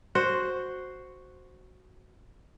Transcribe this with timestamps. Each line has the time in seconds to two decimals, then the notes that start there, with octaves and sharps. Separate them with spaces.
0.15 F#4 C5